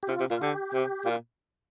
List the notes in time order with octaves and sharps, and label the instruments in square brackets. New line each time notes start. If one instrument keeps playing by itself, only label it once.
[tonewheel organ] G4
[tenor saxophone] C3 [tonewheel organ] F4
[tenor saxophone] C3
[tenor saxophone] A#2 [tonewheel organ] F4
[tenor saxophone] D3 [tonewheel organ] G4
[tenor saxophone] C3
[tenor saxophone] A#2 [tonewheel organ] F4